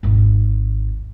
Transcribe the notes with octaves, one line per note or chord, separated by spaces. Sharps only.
G#1 D#2